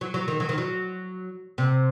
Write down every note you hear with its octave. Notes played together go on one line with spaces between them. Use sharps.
F#3
F#3
D#3
F#3
D#3
F#3
C3